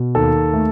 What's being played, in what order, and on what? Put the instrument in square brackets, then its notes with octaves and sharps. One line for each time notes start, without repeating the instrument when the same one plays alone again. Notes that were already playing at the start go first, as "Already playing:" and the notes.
Already playing: [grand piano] B2
D#2 A4
A3